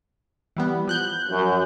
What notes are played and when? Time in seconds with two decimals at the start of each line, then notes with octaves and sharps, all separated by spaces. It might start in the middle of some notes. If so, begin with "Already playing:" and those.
0.57 E3 G3 B3
0.87 F3 F#6 G6
1.29 F#2